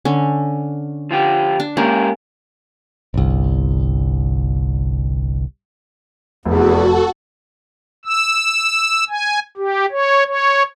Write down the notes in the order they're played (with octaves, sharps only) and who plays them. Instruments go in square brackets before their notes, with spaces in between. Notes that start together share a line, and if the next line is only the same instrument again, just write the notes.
[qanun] D3 C#4
[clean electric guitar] F3 F4 G4
[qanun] D4
[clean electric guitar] G#3 G4 A#4 [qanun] A#3 C#4
[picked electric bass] G1 C2
[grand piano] F1 [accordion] E2 [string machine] F#4 A4
[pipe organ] E6
G#5
G4
C#5
C#5